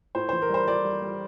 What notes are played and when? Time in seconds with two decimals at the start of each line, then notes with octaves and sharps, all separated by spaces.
0.15 A2 C5
0.29 E3 C5
0.42 A#4
0.49 G3 C5
0.67 G3 D5
0.84 G3
1.02 G3